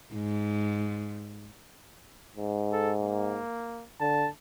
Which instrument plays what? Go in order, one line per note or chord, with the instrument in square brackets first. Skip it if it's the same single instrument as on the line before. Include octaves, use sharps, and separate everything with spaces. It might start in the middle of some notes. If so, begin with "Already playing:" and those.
[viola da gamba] G#2
[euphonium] G#2
[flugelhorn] A4
A#3
[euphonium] D3 [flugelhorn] A5